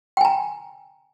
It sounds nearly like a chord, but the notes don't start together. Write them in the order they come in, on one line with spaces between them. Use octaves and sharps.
G5 G#5 A#5